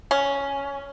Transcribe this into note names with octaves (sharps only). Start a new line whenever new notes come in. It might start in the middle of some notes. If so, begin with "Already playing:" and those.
C#4